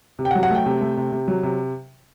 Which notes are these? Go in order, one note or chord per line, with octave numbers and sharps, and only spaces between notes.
C3
G5
F#5
F#3
F#5
A3 G5
C3
A3
C3
C3
F#3
C3